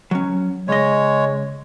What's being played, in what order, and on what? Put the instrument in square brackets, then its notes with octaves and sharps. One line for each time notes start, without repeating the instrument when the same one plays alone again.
[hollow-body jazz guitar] F#3 C#4
[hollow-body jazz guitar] C#2 D#5 [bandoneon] G#3 C#5